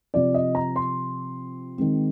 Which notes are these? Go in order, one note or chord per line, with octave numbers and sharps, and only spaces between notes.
C3 F3 C4 D5
D#5
A#5
C6
D#3 G#3 C4